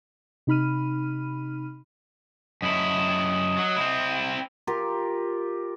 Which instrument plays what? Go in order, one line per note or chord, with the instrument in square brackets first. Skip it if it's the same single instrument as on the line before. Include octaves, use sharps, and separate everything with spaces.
[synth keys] C3 D#4 B5 F6 D#7
[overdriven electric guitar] F#2 E4 [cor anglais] D#5
[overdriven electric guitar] F#3
C4 E4
[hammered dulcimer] F4 G4 A#4